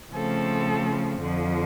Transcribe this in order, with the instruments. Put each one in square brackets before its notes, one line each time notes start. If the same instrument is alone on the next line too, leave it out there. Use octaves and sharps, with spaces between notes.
[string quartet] C#3 F3 A3 C4 A4
F2 D3 F3